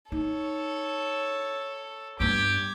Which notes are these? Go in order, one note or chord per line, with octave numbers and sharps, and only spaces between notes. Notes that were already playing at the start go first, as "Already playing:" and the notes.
D#4 A4 C#5
G2 B3 G4 D6 G#6